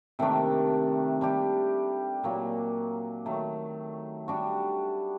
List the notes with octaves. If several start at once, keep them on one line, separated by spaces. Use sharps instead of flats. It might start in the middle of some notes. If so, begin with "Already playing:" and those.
C3 D#3 A3 D4
G3 D4 G4
A#2 F#3 A#3
D#3 F#3 A3
G3 D4 F#4